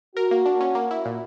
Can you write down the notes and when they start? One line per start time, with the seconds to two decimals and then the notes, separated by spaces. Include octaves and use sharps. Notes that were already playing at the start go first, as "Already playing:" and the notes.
0.16 F#4 A#4
0.31 A#3
0.46 D4
0.61 C#4
0.75 A#3
0.91 E4
1.06 A#2